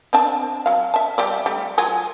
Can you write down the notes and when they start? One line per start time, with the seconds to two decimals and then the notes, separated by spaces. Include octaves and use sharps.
0.13 C4 D4 A5
0.66 F#3 F5
0.94 E5 A5
1.18 G3 G4 D5
1.46 G3 A3 G4
1.78 F#3 F4 G#4